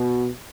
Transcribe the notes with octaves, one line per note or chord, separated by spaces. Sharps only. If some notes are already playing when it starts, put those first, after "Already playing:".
Already playing: B2